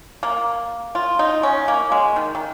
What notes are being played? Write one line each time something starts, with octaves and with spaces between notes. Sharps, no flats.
A#3
F4
D#4
C#4
A#3
G#3
D#3
D#3